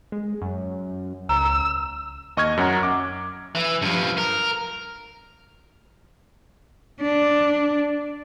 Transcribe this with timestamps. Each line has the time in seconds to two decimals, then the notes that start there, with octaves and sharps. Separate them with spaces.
0.12 G#3
0.42 F#2
1.29 C#2 A#5 E6
2.37 D#2 D#5 C#6 F6 G#6
2.57 F#2 C#4 F#5 A#5
2.83 D6
3.55 E3
3.82 G2 F3
4.18 A#4
7.02 D4